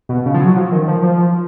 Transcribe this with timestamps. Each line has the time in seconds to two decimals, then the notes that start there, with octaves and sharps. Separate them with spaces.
0.09 B2
0.26 C#3
0.34 F3
0.41 F#3
0.57 F3
0.72 D#3
0.88 F3
1.03 F3